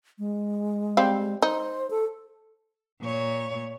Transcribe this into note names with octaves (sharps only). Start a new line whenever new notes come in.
G#3
G3 C4 F5
D#4 C5
A4
A#2 C#5